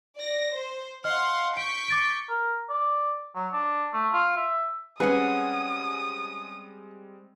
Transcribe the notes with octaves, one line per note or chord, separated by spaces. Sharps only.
D5 A#6
C5
D#5 F5 F#5 C6 F6
C#6 G6 B6 D7
D6 A6 D7
A#4
D5
F#3
D4
A3
F4
E5
G3 G#3 C4 C#4 G#4 B4 F#5 D#6